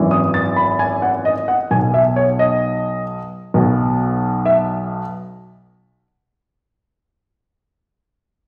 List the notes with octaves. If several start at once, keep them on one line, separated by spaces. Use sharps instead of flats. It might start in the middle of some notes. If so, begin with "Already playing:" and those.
Already playing: G#1 F#2 E3
D#6
A6
B5
G#5
F#5
D#5
F#5
B1 B2 G#5
E5
C#5
D#5
B1 B2
E5